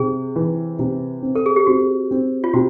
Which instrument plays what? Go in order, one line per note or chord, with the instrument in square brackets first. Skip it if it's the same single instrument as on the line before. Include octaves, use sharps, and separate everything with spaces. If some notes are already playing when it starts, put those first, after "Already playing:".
Already playing: [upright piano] C3 [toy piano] G#4
[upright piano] E3
C3
C4
[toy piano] A4
G#4
G4
[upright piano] C4 [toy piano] F#4
[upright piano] C4
[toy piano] F4
[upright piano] C3 [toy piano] F#4